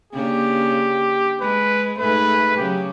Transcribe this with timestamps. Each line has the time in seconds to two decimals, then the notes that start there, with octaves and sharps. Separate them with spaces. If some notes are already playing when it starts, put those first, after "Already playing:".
0.13 C#3 A#3 D4 G4
1.41 G#3 B4
1.98 G#2 A3 G#4 B4
2.57 C#3 F#3 G4